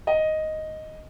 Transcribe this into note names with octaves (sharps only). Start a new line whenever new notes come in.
D#5